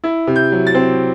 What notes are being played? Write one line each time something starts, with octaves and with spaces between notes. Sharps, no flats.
E4
C3
G6
F#3
A6
C4